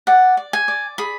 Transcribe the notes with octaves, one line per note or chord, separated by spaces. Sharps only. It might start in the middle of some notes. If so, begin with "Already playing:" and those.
D5 F#5
D5
G#5
D5
G#4 B5